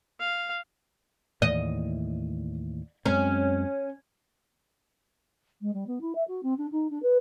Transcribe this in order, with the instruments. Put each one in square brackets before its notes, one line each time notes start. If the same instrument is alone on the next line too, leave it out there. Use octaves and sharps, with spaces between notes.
[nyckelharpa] F5
[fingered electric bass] D#2 A2 E3 [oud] D#5
[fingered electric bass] F#2 G#3 C4 [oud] C#4
[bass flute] G#3
G3
B3
E4
E5
F#4
C4
D4
D#4
D4
B4